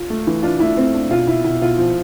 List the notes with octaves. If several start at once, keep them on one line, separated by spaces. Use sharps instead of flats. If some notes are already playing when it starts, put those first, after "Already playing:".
Already playing: F4
A3
E3
D4 F4
A3 E4
A3 C4
D4
B2 F4
B2 E4
B2 E4
B2 F4
F3